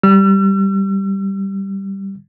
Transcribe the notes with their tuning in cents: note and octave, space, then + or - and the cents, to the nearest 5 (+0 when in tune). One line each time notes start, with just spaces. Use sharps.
G3 -5 E6 +45